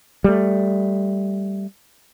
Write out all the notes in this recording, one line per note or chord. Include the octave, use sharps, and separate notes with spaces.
G3 A3